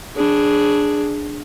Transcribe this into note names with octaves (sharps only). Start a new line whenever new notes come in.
D4 G#4